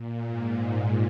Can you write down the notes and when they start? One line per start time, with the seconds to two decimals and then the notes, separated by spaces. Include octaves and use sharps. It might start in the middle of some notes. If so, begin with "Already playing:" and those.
Already playing: A#2
0.26 G#2